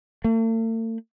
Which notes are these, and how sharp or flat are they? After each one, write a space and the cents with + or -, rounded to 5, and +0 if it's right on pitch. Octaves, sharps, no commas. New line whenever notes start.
A3 +45